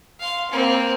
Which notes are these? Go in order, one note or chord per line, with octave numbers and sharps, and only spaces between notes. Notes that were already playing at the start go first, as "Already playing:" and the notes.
F5 C6
A#3 C4